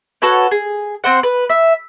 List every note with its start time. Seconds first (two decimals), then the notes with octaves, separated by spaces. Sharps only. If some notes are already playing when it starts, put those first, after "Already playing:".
0.22 F#4 A4 B4 C#5
0.51 G#4
1.04 C4 C5 F#5
1.23 B4
1.50 E5